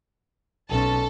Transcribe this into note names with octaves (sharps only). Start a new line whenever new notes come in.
B1 C#4 A4 A5